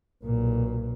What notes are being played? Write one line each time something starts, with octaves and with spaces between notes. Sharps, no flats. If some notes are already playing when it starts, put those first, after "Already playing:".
B1 A#2